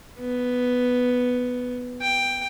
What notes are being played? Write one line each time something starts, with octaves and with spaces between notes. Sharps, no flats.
B3
G5